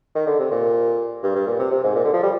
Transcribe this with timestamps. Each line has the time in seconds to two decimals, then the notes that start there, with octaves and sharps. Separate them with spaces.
0.15 D#3
0.27 D3
0.39 C3
0.51 A#2
1.23 G2
1.36 G2
1.47 A#2
1.59 C3
1.72 C3
1.84 G#2
1.95 A#2
2.05 D3
2.13 F3
2.23 G3